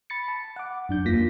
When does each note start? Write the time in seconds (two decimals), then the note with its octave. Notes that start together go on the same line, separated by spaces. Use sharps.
0.10 B5 A6 C#7
0.28 A5
0.56 F#5 D6
0.89 F#2 D4 G6
1.05 E2 A#3 F4 A#6 B6